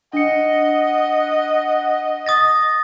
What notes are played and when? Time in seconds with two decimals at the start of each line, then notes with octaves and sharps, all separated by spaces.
0.13 D4 D#5 F#5 C#7
2.26 D#6 A6 A#6